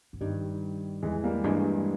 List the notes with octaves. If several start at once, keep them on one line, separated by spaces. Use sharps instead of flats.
G#2
G2 D#3 G3
E2 E3 G#3
G3 A#3
G2 E3 G#3